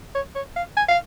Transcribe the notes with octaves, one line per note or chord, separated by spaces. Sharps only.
C#5
C#5
F5
G#5
F5